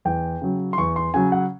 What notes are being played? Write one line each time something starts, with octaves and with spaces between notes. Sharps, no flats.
E2 G5
C#3 F#3
C6
E2 C#6
C6
C#3 F#3 G#5
F#5